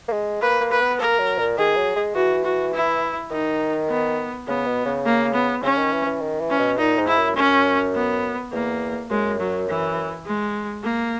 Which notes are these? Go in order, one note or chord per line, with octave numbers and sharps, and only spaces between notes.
A#3
G#3
A#3 B4
A#3
B4
B3
A#3 A#4
F#3
A#2
D#3 G#4
F#3
G#3
E3 F#4
F#4
E4
D#3 D#4
B3
C#3 B3
B2
C#3
A#3
B3
C#3 C#4
D#3
E3
E3
D#3
E3
C#4
B2
A#2 D#4
G#2
E4
F#2
F#2 C#4
B3
E2 A#3
F#2 G#3
F#3
E3
G#3
A#3